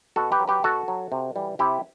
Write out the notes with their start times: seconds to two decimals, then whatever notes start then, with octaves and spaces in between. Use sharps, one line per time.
0.16 B2 F#4 A4
0.32 G4 B4
0.40 F#3
0.48 G4 B4
0.63 B2 F#4 A4
0.88 F#3
1.12 C3
1.36 E3 G3
1.59 C3 E4 G4